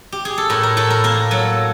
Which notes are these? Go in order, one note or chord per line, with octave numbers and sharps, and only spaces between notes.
G4
G#4
A4
A2 A#4
A#4
A2 A4
A#4
A#3 A#4
F#3 A4